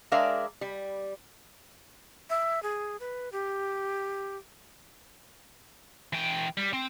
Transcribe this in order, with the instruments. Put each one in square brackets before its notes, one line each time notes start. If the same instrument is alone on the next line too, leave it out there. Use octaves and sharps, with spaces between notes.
[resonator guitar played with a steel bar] G#3 D4 A#4 D5 E5 F5
G3
[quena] E5
G#4
B4
G4
[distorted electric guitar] E3 G5
G3
C4